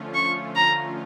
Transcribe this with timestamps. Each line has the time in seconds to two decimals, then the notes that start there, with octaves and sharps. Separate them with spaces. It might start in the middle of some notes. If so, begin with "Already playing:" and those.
Already playing: D3 F3 A3 C#4 F4
0.15 C#6
0.56 A#5